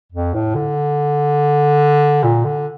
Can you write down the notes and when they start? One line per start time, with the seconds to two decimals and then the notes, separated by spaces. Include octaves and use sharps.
0.13 F2
0.34 A2
0.55 D3
2.24 A#2
2.45 D3